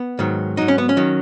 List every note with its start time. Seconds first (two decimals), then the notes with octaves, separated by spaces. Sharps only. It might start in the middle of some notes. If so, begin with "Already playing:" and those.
Already playing: B3
0.19 G#2 D#3 F#3
0.57 G#2 F#3 D#4
0.68 C#4
0.78 B3
0.89 C#4
0.97 D#3 F#3